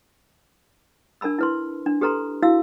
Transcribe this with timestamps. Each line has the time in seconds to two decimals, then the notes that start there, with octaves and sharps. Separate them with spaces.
1.21 D4 A#4 A5 B5 E6
1.39 E4 B4 C6
1.86 D4
2.01 G4 A4 B4 A#5 C6
2.42 E4 F#4 F5 E6